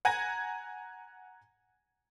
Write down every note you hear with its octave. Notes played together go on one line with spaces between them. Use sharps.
F#5 G#5 A#5 G#6 A#6 D#7